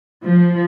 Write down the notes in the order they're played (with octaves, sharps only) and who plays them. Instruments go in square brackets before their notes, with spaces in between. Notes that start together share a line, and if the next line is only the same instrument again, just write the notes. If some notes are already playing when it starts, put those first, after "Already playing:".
[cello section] F3